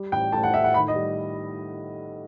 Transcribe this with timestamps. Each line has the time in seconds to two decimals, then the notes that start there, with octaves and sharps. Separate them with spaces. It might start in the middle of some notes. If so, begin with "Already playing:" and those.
Already playing: G3
0.12 A1 G5
0.32 A2 A5
0.43 F#5
0.54 A2 E5
0.64 F#5
0.74 D#3 B5
0.88 D#5
0.95 G3